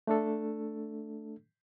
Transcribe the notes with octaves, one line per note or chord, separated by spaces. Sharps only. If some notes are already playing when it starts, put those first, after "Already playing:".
A3 D4 A4